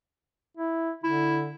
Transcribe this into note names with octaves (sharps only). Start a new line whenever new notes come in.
E4
D3 E4